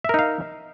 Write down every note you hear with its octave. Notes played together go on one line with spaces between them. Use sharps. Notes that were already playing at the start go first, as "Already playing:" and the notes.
D#4 A#4 E5 F5